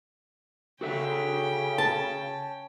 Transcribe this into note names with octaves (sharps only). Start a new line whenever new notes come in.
C#3 C#4 F#4 A4 E5 G5
A5